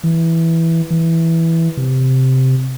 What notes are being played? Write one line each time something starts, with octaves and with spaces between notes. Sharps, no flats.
E3
E3
C3